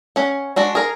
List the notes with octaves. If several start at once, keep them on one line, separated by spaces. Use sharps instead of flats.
C#4 F#5
G#3 D4 F#4
G#4 A#4